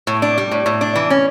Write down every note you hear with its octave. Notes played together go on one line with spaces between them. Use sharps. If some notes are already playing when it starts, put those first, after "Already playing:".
A2
D4
G3
A2
A2
D4
E3
C#4